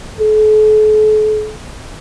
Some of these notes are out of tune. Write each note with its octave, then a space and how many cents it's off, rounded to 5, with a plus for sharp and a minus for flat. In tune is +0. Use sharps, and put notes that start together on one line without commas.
A4 -45